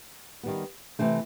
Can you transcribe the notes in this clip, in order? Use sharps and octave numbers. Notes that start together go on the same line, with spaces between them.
D#3 G3 B3
C3 E3 A3 C5